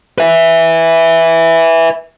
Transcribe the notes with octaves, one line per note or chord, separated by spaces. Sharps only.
B4 E5